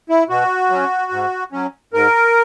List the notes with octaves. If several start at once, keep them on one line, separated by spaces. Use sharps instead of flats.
E4
B2 F#4
F#3 C#4
G#2
F#3 C#4
G#2 A#4